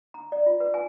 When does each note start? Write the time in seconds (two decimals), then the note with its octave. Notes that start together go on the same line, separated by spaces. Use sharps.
0.14 A#5
0.32 D5
0.46 F4
0.60 B4
0.74 G#5